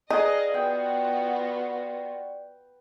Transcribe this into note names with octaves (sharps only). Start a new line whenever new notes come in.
D#4 G#4 B4 D5 D#5 F5 D#6
B3 F4 F#4 G5